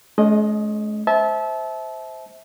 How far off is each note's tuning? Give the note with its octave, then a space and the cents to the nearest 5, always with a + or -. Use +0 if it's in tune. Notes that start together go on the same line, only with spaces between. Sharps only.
G#3 +45 C#4 +35 D#5 +0
C5 +0 E5 -20 A5 -25